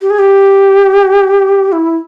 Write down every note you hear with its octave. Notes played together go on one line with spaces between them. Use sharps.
G4
G#4
G4
E4